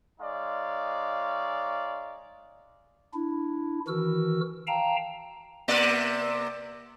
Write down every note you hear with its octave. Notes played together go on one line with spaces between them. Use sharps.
G#3 D#4 C#5 D5 F5
D4 E4
D#3 E3 F#4 A#4 E6
F5 G5 A5 A#5
C3 A#3 D5